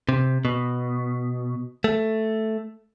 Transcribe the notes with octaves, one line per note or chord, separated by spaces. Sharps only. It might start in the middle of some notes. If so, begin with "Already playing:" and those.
C3
B2
A3